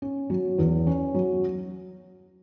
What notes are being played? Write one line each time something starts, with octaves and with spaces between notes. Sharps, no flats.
C#4
F#3
E2
C#4
F#3